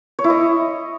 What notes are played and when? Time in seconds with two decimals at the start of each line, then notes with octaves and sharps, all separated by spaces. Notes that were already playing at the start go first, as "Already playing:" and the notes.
0.19 C#5
0.24 E4
0.30 D#5